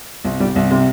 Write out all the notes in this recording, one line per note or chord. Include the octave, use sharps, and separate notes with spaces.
C2
G3
C2
C3